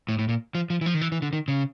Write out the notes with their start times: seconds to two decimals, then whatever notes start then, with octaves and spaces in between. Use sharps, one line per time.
0.09 A2
0.19 A2
0.29 A#2
0.55 F3
0.70 F3
0.81 E3
0.86 F3
0.94 D#3
1.01 E3
1.12 E3
1.22 D3
1.33 D#3
1.48 C#3